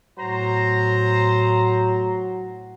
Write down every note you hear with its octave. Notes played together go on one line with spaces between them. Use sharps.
A2 F#3 C5 A#5